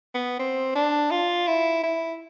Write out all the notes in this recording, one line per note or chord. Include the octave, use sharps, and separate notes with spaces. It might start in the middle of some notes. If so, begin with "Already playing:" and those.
B3
C4
D4
F4
E4
E4